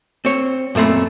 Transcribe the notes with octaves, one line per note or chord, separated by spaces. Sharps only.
C4 C#5
F#2 A#2 A3 C4 B5